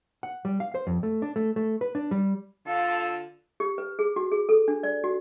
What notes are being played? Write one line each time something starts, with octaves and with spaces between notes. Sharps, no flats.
F#5
G3
F5
C5
F2
A3
D4
A3
A3
B4
D4
G3
D3 F4 A4 F5
G4
B4
G#4
F#4
G#4
A4
D4
D5
F#4